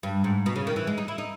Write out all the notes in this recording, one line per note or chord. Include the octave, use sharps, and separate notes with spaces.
G2
G#2
B2
C#3
D#3
E3
G#3
D#4
E4
D#4